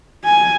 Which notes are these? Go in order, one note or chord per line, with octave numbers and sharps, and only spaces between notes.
G#5